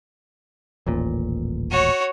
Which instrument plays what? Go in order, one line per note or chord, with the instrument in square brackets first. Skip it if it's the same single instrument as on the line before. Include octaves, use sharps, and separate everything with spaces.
[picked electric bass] D#1 A1 A#2
[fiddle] F#4 C#5